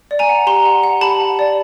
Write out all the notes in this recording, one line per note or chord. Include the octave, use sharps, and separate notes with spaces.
D5
G#5 A#5
F#5
G4 A#5 C6
F#5
F#5
G4 A5 B5
F#5
D5